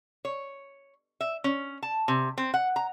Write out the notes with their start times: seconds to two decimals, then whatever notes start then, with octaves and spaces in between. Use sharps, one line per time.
0.25 C#5
1.21 E5
1.44 C#4
1.83 A5
2.08 C3
2.38 C4
2.54 F#5
2.76 A#5